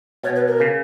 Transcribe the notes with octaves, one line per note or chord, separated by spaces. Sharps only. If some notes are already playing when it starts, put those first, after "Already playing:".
B2 C#5
B4
A#4
C#3